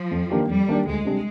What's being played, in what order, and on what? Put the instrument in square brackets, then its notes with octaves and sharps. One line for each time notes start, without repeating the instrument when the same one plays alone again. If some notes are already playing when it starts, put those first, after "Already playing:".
Already playing: [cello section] F3
[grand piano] F2
D#3 A#3 D4 G4
[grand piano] F2 [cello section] G3
[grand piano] D#3 A#3 D4 G4
[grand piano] D2 [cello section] G#3
[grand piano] C3 G3 D4